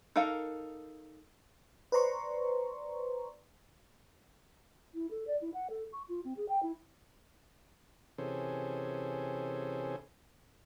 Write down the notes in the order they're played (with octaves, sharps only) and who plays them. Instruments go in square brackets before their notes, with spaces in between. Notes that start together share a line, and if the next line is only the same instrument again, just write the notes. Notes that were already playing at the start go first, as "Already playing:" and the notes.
[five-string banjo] D#4 A4 A#4 F5
[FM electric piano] B4 C5 D5 A#5 C6 C#6
[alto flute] E4
A4
D5
E4
F#5
A4
C#6
F4
C4
G#4
G5
E4
[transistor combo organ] C3 E3 C#4 G#4 A4 C5